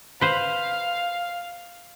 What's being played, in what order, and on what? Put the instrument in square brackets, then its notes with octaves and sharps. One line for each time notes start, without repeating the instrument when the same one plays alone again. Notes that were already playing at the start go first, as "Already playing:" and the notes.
[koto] B4 C5 [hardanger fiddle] F5